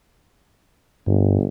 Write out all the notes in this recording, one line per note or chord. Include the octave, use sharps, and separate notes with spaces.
G1 G2